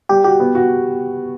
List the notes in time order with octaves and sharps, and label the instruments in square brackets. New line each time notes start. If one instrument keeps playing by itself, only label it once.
[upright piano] G3 [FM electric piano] G4
[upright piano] F#4 [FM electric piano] G4
[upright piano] B3
F#4